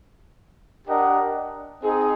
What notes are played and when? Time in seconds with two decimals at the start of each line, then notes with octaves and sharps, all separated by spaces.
0.87 D4 G4 A#4 D#5 F#5
1.82 C4 D#4 G#4